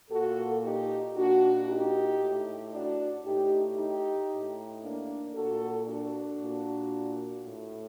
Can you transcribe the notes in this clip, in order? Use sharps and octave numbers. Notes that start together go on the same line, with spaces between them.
A#2 F#4 A4
D#4 G4
A#2 D4 F#4
D#4 G4
A2
D4 F#4
A2 D#4 G4
D#4 G4
A2
A#3 D4
A#2 F#4 A4
D4 F#4
A#2
A2